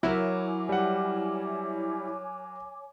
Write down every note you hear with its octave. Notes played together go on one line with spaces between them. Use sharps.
F#3 E4 A#4 C#5 G#5 D6
G3 F#5